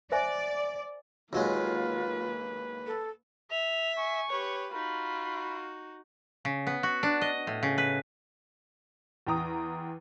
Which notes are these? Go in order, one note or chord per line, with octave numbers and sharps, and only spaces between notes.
C5 D5 E5 G#5
D#2 F#3 G#3 A#3 F4 B4
A4
E5 F7
G#5 C#6
G4 B4 C#5
D#4 F4 F#4 B5
C#3
B3
F#4
D4
D#5
A2
C#3
B4
E2 G5 A#5 D#6